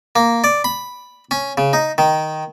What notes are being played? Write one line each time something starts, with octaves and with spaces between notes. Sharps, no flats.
A#3
D5
B5
C#4
C#3
D#4
D#3